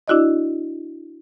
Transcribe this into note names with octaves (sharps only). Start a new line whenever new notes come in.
D4 E4 F#4 D5 D#5